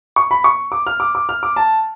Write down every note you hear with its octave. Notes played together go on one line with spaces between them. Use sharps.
C#6
B5
C#6
D6
F6
D6
D6
F6
D6
A5